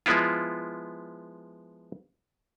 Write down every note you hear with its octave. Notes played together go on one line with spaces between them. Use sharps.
F3 G#3 B3 E4 F4